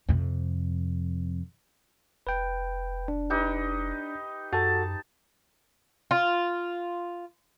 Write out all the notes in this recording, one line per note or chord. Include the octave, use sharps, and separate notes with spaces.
F2 C3
F1 B4 G5
D4
D#4 G4 B4
F#2 F#4 A4 A5
F4